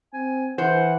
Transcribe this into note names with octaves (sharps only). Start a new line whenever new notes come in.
C4 G#5
E3 C5 F#5